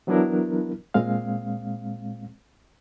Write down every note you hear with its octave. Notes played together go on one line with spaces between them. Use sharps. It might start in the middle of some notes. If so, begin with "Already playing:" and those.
E3 F#3 B3 D4 E4 A#4
A#2 G#3 C4 F5